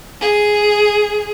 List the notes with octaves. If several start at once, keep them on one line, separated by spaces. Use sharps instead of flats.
G#4